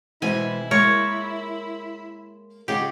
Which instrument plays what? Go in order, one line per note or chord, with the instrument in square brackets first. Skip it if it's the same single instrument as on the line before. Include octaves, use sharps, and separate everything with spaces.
[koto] B2 G#5 [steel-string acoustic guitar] E3 G#3 C4 [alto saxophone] E4
[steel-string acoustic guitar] G#3 A#3 [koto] A#4 [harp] C#5
[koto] C#3 G4 [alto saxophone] G#3 [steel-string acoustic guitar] F4 F#5